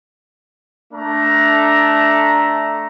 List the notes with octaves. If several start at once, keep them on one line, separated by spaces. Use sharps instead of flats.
A3 D4 A#5